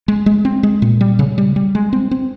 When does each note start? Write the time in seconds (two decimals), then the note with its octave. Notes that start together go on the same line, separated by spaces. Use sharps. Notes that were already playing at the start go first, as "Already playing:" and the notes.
0.08 G#3
0.26 G#3
0.45 C4
0.63 G#3
0.82 A#2
1.01 G3
1.19 C#3
1.38 G3
1.56 G3
1.75 G#3
1.93 C4
2.11 C4